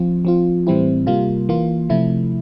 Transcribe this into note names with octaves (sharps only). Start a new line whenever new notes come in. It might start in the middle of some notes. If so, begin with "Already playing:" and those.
Already playing: F3 C4 F4
F3 C4 F4
A2 E3 G3 C4 E4
C3 G3 A#3 F4
E3 A#3 F4
C3 F3 A3 E4